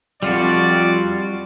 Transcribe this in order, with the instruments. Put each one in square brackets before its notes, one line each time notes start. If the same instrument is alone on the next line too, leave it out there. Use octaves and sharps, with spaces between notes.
[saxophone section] F2 [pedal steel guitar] G3 F4 F#4 [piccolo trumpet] D5